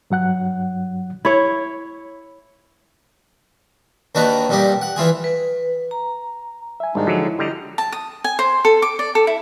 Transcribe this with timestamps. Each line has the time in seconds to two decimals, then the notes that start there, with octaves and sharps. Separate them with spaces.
0.10 G2 F#3 F#5 F#6
1.25 E4 C#5
4.15 D#2 D#3 D4 F#4 B4 A#5
4.49 A#2 G3 D#4 G4
4.82 F#5
4.96 E3 E4 F4 G#4
5.24 B4
5.91 A#5
6.80 E5 G#5
6.95 G#1 G3 G#3 D4 D#4
7.07 D3 F3 F#3 F#4
7.23 E4
7.39 D3 G3 D#5 A#5
7.78 A5
7.92 D#6
8.24 G#5
8.39 C5
8.65 A4
8.82 D6
8.99 D5
9.15 A4
9.27 E4